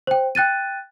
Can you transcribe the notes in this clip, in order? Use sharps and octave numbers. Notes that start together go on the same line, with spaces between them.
C5 G5
G5 F#6 A6 D#7